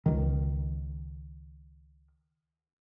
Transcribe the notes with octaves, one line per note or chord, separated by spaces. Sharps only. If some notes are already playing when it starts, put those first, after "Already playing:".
C#2 D#3